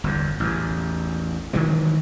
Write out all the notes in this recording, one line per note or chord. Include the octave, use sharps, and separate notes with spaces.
G1 E2
A1 E2
D#3 E3 F#3 G#3